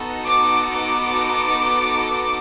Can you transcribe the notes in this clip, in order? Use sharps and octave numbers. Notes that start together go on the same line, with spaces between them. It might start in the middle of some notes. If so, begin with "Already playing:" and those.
Already playing: B3 D#4 F#4 A4
D6
D6